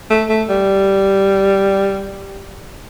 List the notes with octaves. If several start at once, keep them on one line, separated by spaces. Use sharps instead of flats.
A3
A3
G3